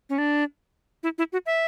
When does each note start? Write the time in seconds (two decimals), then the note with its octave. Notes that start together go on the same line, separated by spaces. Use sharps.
0.10 C#4
0.18 D4
1.03 E4
1.18 E4
1.33 F#4
1.46 E5